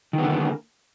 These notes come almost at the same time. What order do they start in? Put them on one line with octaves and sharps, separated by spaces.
D#3 B3 D3 A#3